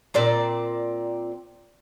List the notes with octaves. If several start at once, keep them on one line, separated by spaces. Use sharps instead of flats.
A#2 C4 D5 A#5